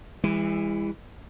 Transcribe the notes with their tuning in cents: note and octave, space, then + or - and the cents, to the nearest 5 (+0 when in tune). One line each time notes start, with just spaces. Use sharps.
E3 +0 G#3 -45